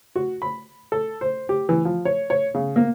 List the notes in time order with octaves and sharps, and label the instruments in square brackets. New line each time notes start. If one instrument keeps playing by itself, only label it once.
[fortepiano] F#4
B5
A4
C5
G4
E3
F3
C#5
C#5
C#3
A#3